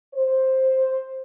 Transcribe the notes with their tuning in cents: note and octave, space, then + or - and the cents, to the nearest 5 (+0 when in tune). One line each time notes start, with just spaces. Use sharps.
C5 +5